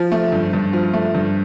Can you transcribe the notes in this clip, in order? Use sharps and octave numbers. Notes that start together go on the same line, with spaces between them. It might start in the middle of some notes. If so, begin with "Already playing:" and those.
Already playing: F3
A3
G2
G2
F3
A3
G2